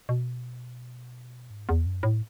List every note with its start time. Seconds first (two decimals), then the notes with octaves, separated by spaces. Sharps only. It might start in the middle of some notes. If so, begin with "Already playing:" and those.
0.09 B2
1.51 G#2
1.69 E2
1.86 F#2
2.03 A2